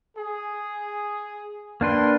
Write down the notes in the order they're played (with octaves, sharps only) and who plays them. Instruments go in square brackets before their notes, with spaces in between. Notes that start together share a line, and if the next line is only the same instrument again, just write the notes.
[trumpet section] G#4
[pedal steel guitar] A#3 D4 B4 [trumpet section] G5 A5 C6